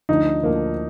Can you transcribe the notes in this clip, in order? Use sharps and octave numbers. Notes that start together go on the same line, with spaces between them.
D2 D3 F3 D#4
D2 D3 F3 A#3